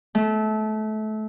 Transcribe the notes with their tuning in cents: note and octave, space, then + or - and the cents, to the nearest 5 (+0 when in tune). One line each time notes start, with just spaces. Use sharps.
A3 -25